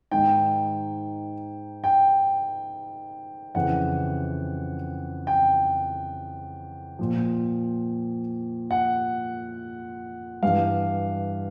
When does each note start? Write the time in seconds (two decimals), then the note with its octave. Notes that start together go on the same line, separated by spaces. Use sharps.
0.11 G#2 D#3 G5
1.84 G5
3.55 F2 C#3 E3 F#5
5.27 G5
6.99 A#2 F3
8.71 F#5
10.43 G2 E3 F5